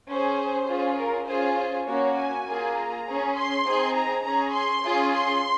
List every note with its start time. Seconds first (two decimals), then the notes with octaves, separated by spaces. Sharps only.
0.09 C#4 G#4 C5
0.68 C#4 F4 G#4
0.98 A#4
1.28 C#4 F4 G#4 C5
1.87 A#3 C#4 F#4 C#5
2.17 G#5
2.47 A#3 F4 G#4
2.76 A#5
3.07 C#4 G#4
3.36 C6
3.66 C4 D#4 G#4
3.96 A#5
4.24 C#4 G#4 A#5
4.54 C6
4.84 C#4 F4 G#4
5.13 C6